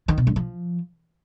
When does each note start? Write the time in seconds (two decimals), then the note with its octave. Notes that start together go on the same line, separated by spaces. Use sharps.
0.08 D#3
0.18 B2
0.27 G2
0.36 F3